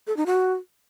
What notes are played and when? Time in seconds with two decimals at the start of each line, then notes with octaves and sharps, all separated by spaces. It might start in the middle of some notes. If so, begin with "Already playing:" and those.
0.07 A4
0.17 D#4
0.26 F#4